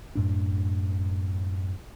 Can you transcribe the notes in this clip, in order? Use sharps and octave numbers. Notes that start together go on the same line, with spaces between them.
F#2 A2 D4